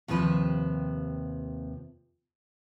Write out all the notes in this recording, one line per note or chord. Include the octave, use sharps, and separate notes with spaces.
D#2 C3 F3 B4 C5